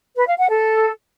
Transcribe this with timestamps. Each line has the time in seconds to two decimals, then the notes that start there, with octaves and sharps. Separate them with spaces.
0.16 B4
0.27 F5
0.38 F#5
0.49 A4